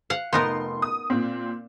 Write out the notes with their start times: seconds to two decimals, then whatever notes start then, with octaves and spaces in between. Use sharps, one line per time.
0.10 F5 F#5
0.33 F1 B3 D#4 A#4 C6
0.82 D#6
1.10 A#2 C4